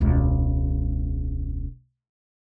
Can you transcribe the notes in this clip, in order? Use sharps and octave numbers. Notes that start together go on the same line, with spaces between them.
E1 C#2